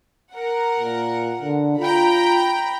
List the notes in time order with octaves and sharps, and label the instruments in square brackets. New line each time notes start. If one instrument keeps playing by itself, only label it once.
[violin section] A#4 F#5
[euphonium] A#2
D3
[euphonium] F4 [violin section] G5 A#5 B5